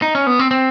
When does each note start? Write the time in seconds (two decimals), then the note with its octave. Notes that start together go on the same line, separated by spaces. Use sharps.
0.02 D#4
0.15 C#4
0.27 B3
0.39 C4
0.51 C4